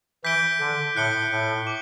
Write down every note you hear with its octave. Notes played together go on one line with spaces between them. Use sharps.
E3 G6 B6 D7 G7
D3
A2 F#6 C#7 G7
A2
D6